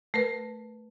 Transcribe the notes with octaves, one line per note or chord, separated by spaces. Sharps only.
A3 A#4 B4